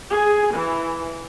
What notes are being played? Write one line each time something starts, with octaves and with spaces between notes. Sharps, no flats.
G#4
E3